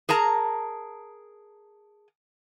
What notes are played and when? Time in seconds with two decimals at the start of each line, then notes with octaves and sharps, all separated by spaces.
0.09 G#4 A#4 A5 A#5